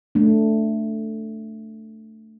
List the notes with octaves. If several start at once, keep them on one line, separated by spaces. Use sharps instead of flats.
A3 D4